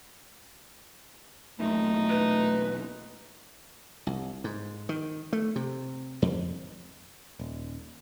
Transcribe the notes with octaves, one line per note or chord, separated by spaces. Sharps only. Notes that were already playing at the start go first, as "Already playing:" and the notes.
E1 B1 A#2 A3 D#4
B4
C2
G#2
D#3
A3
C3
F2
D#1